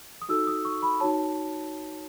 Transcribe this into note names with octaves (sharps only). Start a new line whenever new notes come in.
D#6
D#4 F#4 A4 E6
D#6
C#6
B5
D#4 F#4 C#5 A5